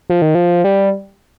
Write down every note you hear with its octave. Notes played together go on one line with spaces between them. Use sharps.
F3
D#3
F3
G3